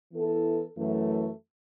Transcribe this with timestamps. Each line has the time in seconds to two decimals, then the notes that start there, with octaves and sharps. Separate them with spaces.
0.13 E3 B3 E4 A4
0.77 F#2 E3 A3